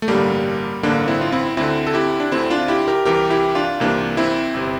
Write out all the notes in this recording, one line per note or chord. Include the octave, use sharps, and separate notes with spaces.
A3
A1 G2 D3 G3 A#3
A1 G2 D3 A#3 D4
C4 E4
F4
C4 E4
D2 D3 C4 E4
A4
E4 G4
D4
D2 D3 C4 E4
D4 F4
E4 G4
G4 A#4
C2 C3 E3 G4 A#4
E4 G4
D4 F4
C2 C3 E3 A#3 D4
C4 E4
G1 C3